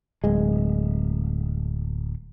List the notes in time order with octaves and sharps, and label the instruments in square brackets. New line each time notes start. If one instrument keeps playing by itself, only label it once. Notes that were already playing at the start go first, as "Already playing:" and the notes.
[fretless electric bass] D1 G#3